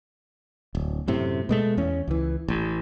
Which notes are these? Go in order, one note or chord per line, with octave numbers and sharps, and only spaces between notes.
D1
F#2 A2 C3
B2 G#3 A3
E2 C#4
C#2 E3
A1